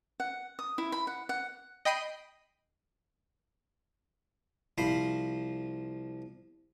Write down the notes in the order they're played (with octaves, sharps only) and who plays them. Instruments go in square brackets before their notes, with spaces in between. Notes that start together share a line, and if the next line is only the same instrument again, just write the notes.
[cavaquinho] F#5
D#6
E4
B5
F#5
F#5
[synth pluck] D#5 G5 B5 C7 D#7
[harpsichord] C2 F3 C5 B5